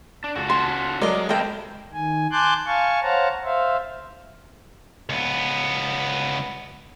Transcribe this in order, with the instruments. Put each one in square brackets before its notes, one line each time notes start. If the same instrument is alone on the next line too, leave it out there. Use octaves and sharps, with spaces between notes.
[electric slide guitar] D4
[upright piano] C#2 [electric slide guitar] F#4 A4
[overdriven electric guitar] C#4 A5 [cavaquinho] C6
[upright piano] F#3 A#4 [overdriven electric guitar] G#3 [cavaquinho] D5 D#5
[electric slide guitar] E2 A#3 E4 [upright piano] A4 D#5 [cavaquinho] C5 G5
[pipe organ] D#3 G#5
G#5 A5 C6 D6 F#6 G6
F5 G#5 A5 C#6
C5 C#5 F5 F#5 A5 A#5
C5 E5 F5
[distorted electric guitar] C#2 B3